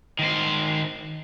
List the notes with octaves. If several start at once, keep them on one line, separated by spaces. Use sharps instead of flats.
D#3 C5